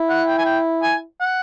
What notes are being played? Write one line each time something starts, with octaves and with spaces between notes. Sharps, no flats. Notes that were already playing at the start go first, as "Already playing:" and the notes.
Already playing: E4
F#5
G5
G#5
G5
G#5
F#5